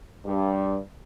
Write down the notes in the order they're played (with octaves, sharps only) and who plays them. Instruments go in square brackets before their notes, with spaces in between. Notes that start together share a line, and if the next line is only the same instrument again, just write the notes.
[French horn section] G2